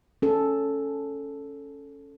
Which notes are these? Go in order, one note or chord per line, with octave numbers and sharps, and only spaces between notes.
C#4 A4